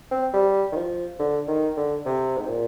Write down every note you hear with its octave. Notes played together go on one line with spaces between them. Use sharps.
C4
G3
D#3
F3
D3
D#3
D3
C3
G#2
A#2